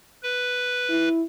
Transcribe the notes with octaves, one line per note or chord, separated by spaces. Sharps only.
B4
E4